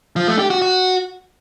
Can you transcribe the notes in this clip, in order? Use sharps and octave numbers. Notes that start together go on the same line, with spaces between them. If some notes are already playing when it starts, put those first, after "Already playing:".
F3
A3
G4
F#4
F#4